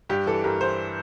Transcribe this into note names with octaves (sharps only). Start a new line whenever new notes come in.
G2 G4
E3 A4
G2 A#4
E3 C5